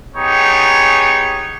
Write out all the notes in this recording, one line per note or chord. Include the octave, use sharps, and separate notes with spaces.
B3 D#4 G4 G#4 C#5